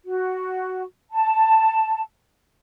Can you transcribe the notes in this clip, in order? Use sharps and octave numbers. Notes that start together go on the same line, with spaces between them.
F#4
A5